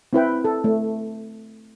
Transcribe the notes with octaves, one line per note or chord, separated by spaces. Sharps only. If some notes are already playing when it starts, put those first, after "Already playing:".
C4 E4 B4 G5
A4
A3